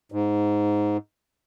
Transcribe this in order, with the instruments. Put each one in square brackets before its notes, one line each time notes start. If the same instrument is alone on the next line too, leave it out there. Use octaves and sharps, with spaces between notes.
[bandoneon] G#2